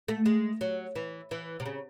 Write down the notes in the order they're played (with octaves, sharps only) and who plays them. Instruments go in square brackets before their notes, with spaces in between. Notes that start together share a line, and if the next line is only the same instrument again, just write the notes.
[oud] A3
G#3
F#3
E3
E3
C3
C#3